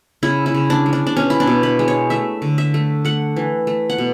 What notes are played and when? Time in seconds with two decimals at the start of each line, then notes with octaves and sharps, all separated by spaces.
0.23 C#3 E4
0.46 E4
0.54 C#3
0.70 D4
0.86 G#3
0.93 D4
1.07 D4
1.17 B2 C#4
1.30 E4
1.40 D4
1.47 B2
1.63 B4
1.79 G#3
1.88 C#5
2.10 A3 E5
2.42 D3
2.58 E5
2.74 A3
3.05 A3 F#5
3.36 E3
3.67 A3
3.90 F#5
3.98 B2